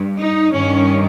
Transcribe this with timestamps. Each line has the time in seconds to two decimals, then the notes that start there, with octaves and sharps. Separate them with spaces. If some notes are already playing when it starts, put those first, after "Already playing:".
Already playing: G2
0.18 D#4
0.53 G2 D#3 C#4